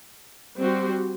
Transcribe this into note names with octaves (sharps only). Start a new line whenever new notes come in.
G3 C4 F#4 C5